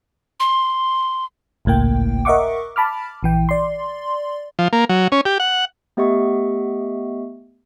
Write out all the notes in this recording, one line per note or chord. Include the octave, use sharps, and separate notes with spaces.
C6
G#1 C#2 A2 A#3 G5
A#4 D#5 E5 F#5 C#6 D6
A5 B5 D6 F6
A#1 E3 G5
D5 C6
F3
A#3
F#3
C#4
G4
F#5
A3 B3 G4 D#5 E5 C#6